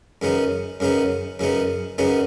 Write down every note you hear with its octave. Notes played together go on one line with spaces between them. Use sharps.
F#2 C#3 F#3 B3 D#4
F#2 C#3 F#3 B3 D#4
F#2 C#3 F#3 B3 D#4
F#2 C#3 F#3 B3 D#4